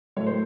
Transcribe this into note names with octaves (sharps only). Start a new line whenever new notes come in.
A2 F#3 A3 C#5
C5